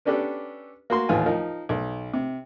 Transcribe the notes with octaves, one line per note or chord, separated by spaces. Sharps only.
B3 C#4 D4 G4 A4 B4
A#3 F#4 C6
A1 D#2 E3 F4 G#5
F3 D#4 A#4
B1
C3